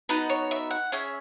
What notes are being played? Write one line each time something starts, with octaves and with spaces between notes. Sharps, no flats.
B3 D#4 F#4 B4
C#5
E5
F#5
C#4 G#4 E5